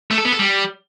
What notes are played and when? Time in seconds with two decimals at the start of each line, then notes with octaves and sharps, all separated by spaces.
0.11 A3
0.18 A4
0.25 B3
0.32 A4
0.39 G3